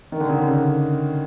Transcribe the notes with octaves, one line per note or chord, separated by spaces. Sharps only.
D#3
D3
C#3
D3